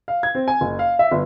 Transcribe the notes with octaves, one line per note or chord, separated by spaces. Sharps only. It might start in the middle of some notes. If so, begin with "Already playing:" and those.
F5
G#6
C4
G#5
F#1
F5
E5
G1